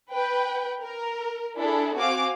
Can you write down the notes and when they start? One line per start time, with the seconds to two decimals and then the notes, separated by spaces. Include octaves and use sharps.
0.12 B4 G5
0.81 A#4
1.58 D4 E4 G#4 A4
1.96 C4 F#4 F5 G#5 D6